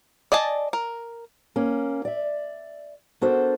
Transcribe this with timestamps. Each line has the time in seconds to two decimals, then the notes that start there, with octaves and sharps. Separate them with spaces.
0.32 D5 D#5 G#5 A5
0.73 A#4
1.56 A#3 C#4
2.05 D5 E5
3.21 B3 D4 F#4 A4 A#4 C5